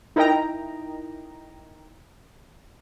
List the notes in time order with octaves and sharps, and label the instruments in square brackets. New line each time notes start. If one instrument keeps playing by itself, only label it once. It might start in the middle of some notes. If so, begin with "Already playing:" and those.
[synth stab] D#4 E4 A#4 D#5 G5 A#5